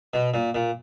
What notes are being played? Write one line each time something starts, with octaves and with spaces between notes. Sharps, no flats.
B2
A#2
A#2